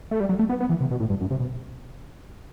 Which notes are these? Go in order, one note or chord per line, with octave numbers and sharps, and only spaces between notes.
A3
G3
F#3
A3
B3
B3
E3
C3
B2
A2
G2
F#2
C3
B2